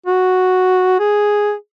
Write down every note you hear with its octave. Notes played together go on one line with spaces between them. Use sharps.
F#4
G#4